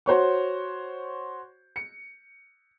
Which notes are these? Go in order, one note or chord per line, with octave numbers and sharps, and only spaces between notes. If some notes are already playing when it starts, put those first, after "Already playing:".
F#4 C5 C#5 C#6
C#7